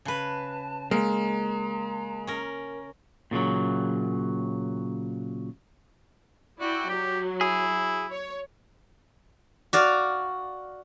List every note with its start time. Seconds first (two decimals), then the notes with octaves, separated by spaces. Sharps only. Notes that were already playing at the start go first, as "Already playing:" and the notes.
0.05 C#3 B4 A5
0.91 G#3 A#3 A#5
2.27 C#4 A#4
3.31 A#2 C#3 E3 F#3
6.61 E4 F#4 D5 G5
6.89 F#3 G4
7.41 E4 G#4
8.12 C#5
9.73 F#4 D5 F5